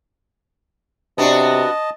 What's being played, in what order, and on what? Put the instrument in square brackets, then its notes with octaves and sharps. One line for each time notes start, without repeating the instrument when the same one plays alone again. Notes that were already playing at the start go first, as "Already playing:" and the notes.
[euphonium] C3 [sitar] B3 D4 F#4 [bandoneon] D#5 A5